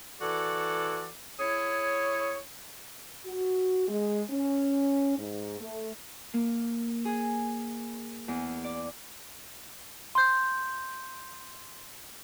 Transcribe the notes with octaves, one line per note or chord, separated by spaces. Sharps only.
E3 F#4 A4 D5
E4 G#4 C#5
F#4
G#3
C#4
G#2
A3
A#3
G#4
E2
D5
C6 G6